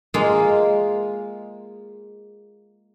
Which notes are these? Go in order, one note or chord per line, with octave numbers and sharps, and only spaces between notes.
G#3 A#3 F4